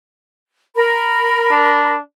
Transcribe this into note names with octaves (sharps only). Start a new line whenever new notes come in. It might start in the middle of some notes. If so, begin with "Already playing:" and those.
A#4 B5
D4